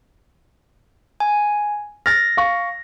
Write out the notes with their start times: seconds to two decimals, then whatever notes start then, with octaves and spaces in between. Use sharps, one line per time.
1.20 G#5
2.06 F6 A6 A#6
2.37 F5 C#6